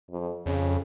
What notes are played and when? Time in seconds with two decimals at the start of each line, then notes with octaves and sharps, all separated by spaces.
0.11 F2
0.46 F2 C#3